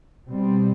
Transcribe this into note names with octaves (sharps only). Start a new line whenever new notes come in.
B2 G3 C4